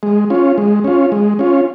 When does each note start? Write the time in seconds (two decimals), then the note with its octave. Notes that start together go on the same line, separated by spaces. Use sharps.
0.03 G#3
0.30 C#4 F4
0.58 G#3
0.84 C#4 F4
1.12 G#3
1.39 C#4 F4